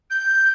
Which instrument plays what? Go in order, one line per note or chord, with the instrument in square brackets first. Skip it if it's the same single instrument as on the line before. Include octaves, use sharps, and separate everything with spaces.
[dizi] G6